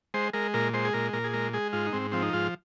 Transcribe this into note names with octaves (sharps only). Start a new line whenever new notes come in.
G#3 C5
G#3 A#4
A#2 A#4
G#3 C5
G#4
A#2 A#4
A#2 A#4
G#4
G#3 A#4
G#3 G#4
G#2 F4
D#4
G#2 C4
F3 C4
D#4
G#2 F4